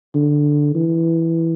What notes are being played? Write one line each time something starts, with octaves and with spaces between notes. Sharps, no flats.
D3
E3